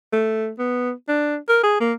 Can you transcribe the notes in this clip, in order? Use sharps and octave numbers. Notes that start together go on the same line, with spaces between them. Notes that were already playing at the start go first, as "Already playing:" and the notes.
A3
B3
D4
A#4
G#4
A#3